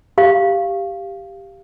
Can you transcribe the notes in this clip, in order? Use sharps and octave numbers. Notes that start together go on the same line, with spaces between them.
G4 F5